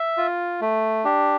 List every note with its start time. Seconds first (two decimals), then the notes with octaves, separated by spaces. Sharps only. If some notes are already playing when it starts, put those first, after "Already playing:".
Already playing: E5
0.17 F4
0.61 A3
1.04 D4 G4